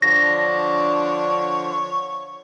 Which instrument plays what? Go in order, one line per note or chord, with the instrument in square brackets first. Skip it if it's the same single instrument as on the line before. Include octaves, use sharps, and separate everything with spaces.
[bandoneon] D3 F3 [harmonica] D4 [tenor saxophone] C#5 [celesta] A#6